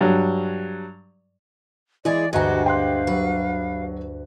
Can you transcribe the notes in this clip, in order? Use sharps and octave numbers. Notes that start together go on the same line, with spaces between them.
G2 F#3
E3 G#3 E4 G#4 D5
D2 G2 G#3 F#4 G4 G#5 A#5
F5 G5 C6 F#6
F#3 G4 B4